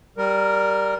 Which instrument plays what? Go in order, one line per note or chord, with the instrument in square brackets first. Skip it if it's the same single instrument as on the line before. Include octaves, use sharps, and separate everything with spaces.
[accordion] G3 A#4